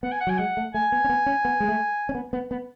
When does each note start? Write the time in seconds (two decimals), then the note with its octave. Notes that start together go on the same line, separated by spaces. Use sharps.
0.03 B3 F#5
0.12 G#5
0.21 F#5
0.27 F#3 G#5
0.38 G#3 F#5
0.57 A3
0.74 A3 G#5
0.92 B3
1.04 C#4
1.09 B3
1.26 C#4
1.45 B3
1.60 G#3
1.68 A3
2.09 C#4
2.15 B3
2.33 B3
2.51 B3